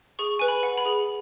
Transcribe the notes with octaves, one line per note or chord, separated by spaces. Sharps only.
G#4 C#6
B4 G#5
B5
F#5
B5
G#4